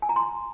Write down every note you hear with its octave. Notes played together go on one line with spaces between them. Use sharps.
G#5
A#5
C6